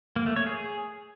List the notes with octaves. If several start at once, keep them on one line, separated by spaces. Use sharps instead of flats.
A#3
A3
C#5
G#4